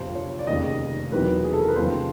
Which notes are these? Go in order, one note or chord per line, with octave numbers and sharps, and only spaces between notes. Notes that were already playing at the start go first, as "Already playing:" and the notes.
Already playing: G1 F2 C3 F3 C5
C#5
D5
F1 D#2 C#3 D#5
E1 E2 C3 D#3 F#3 B4
G#4
A4
A#4
B4
F1 D#2 C#3 F3 C5